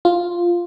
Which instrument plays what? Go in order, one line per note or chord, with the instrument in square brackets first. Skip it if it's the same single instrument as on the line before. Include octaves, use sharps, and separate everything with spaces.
[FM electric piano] F4